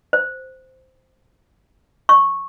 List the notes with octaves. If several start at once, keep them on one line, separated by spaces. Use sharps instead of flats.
C5
C#6